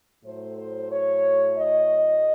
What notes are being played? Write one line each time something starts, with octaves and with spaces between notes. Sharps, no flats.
A2 F#3 A3 C5
C5
C#5
D#5